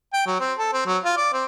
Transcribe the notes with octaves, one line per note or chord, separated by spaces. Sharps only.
G5
F#3
C4
A4
C4
F#3
F4
D5
C4